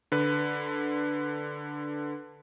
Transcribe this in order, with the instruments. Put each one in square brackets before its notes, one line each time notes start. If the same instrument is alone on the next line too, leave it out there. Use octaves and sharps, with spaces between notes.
[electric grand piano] D3 B4